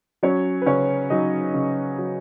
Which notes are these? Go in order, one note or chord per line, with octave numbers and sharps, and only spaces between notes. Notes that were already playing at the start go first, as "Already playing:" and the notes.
F#3 C#4 C#5
B4
C#3 C#4 C#5
F#3 D#4 D#5
C#3
F#3